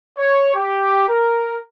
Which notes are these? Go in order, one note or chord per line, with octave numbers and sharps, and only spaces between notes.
C#5
G4
A#4